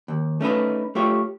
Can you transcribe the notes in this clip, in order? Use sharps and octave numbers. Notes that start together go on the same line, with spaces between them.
D#2
A3 C#4 D#4 B4
A3 F4 G4 C#5